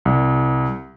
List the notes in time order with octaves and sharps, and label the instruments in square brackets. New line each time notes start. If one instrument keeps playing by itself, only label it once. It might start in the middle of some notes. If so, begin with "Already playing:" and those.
[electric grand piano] C2